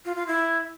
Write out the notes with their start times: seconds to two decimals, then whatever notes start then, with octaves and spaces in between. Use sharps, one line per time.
0.05 F4
0.16 F4
0.27 E4